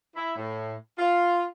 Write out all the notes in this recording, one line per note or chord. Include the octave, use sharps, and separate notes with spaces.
E4
A2
F4